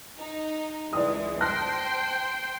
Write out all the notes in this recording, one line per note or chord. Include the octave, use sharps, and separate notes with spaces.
D#4
C#2 E3 G#3 D5 D#6
C5 G5 A5 C6 F#6 A#6